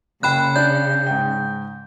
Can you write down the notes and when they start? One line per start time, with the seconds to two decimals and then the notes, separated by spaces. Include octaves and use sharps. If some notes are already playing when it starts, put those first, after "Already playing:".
0.23 F#1 C#3 G5 B5 F#6
0.56 D4 G6
1.07 G#2 G5